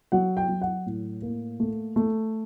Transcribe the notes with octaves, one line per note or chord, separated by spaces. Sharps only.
F#3 F#5
G5
F#3
F#5
A2
A#3
A3
A3